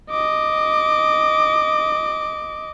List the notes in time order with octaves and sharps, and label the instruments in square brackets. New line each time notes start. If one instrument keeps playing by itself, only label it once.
[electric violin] D#5 D6